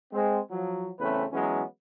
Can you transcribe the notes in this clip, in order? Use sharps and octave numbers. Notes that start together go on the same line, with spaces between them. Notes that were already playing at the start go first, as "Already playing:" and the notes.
G#3 C4
F3 F#3
E2 C#3 A3 C4 C#4 B4
E3 F#3 G#3 B3 C#4